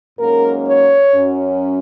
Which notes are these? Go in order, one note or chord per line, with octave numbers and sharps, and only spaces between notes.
G#2 F#3 A#3 C#4 A#4
C#5
F#2 F#3 C#4